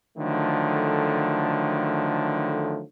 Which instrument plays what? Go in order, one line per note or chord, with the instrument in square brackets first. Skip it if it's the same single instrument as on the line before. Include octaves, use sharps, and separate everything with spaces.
[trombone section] D3 D#3 F3 F#3 A3